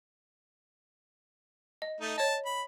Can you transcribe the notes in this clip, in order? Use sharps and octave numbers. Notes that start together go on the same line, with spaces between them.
D#5
A3 D#4
C#5 D#5 A5
B5